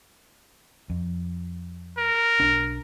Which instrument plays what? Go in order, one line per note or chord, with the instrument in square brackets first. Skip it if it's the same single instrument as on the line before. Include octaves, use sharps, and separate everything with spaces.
[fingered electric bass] F2
[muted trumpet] A#4
[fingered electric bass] B1 D4